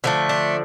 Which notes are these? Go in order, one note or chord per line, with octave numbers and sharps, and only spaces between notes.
D3 F3 A3 B3
D4